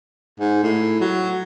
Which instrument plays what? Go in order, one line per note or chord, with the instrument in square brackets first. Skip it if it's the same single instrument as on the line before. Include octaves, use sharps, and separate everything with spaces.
[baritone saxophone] G#2
A2
F#3